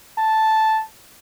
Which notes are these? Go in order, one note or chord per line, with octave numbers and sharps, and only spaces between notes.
A5